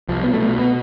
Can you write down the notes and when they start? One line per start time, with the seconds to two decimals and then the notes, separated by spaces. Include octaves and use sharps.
0.09 C2 F3
0.24 B2 B3
0.34 A3
0.42 B2
0.59 B3